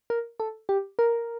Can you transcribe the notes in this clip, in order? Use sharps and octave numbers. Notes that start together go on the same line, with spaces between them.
A#4
A4
G4
A#4